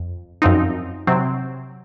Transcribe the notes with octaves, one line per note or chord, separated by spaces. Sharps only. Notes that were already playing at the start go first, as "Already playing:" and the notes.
Already playing: F2
F#2 F3 C4 D#4
C3 F#3 C4